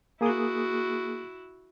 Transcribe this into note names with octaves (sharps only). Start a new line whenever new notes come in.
A#3 E4 F#4 G#4 D#6